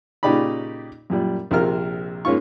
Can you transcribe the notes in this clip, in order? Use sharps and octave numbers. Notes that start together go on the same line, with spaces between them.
A#2 C#3 D#4 G4 D5 B5
F#2 A#2 G3
A#1 C3 F4 A#4 F6
G#2 A#3 C#4 F4 C#6